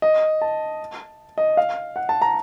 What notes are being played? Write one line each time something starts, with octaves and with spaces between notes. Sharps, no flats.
D#5
A5
D#5
F5
F#5
A5
A#5